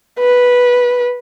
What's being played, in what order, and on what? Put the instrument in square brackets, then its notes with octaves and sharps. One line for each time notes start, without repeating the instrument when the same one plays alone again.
[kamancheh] B4